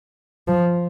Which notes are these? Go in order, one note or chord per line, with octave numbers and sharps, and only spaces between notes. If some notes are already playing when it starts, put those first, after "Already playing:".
F3